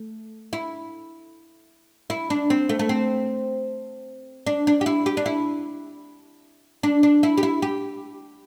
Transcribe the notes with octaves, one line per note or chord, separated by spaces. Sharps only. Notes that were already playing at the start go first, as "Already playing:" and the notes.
Already playing: A3
E4
E4
D4
C4
A3
A3
C4
D4
D4
G4
E4
G4
D4
E4
D4
D4
E4
G4
E4
G4